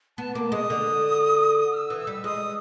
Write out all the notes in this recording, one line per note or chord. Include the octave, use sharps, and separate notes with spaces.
B3 A5
A#3 D6
G#3 D#6
D3
F6
E6
E3
E6
G3
G#3 D#6